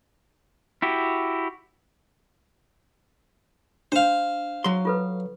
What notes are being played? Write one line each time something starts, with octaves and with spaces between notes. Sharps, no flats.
E4 F#4 G4
D4 C5 F5
F#3 C6
F4 A4 B4